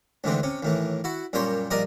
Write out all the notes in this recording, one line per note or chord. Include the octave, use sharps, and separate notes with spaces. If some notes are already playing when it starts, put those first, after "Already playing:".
D2 G#2 D3 E3 C4
C3 C#4
D#2 A2 E3
E4 F#4
F#2 A#2 G3 C5 C#5 C6
A#1 G2 A#4 D5 D#5 A#5